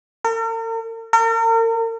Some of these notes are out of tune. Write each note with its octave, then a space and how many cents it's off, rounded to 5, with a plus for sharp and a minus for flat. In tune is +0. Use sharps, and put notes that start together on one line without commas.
A#4 -45
A#4 -40